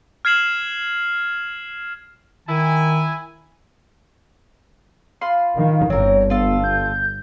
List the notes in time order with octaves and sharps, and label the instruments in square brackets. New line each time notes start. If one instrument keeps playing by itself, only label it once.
[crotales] F6 G#6 C7 E7 F#7
[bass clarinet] D#3 [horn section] E4 G#5
[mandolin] F4 B5 C6
[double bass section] D#3 [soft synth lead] F5
[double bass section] G1 [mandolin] C4 A#4 [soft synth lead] C#5
[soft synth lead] B3 [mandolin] F4 A4
[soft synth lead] G6